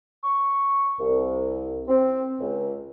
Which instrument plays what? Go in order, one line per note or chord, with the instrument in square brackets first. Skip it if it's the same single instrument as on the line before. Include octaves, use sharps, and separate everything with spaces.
[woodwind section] C#6
C2
C4
C#2